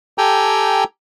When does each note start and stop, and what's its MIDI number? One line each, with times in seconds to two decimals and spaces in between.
0.18 0.84 67
0.18 0.84 69
0.18 0.84 79
0.18 0.84 80
0.18 0.84 82